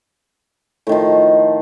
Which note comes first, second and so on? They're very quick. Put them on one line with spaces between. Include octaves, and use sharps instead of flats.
A2 D#3 F3